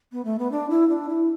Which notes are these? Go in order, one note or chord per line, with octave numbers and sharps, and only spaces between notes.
B3
A3
B3
D4
E4
D4
E4